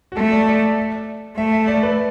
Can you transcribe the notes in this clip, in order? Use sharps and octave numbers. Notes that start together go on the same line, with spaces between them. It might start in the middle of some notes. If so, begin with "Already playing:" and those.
F#4
A3 A4
D5
D5
A3 E5
E5
D5
B4